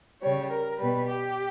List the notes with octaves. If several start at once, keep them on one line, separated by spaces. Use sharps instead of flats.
C#3 G3 C#5
A#4
B2 G3 B4
G4